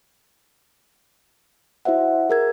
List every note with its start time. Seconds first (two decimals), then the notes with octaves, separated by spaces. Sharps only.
1.85 E4 F#4 C5 E5 F#5
2.29 G#4 A#4 G#6